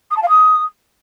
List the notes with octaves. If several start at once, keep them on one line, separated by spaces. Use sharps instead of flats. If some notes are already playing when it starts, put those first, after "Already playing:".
D#6
A5
F5
D#6